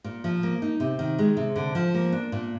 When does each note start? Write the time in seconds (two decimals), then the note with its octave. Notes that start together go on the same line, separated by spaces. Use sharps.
0.04 A#2
0.24 F3
0.43 A#3
0.62 D#4
0.80 C3
0.99 D#3
1.19 G#3
1.37 C3
1.56 D3
1.75 F3
1.94 A#3
2.13 D4
2.32 A#2